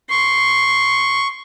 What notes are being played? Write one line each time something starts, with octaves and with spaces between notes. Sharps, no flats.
C6 C#6